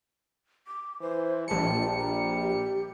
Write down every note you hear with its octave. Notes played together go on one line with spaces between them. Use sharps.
D6
E3 C5
A#1 G3 A5 C#7
A#5
G4